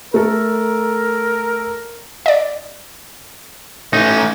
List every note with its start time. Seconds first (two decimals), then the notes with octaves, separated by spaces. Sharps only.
0.14 A3 A4 A#4
2.26 D5 D#5
3.93 A3 C#4 D#4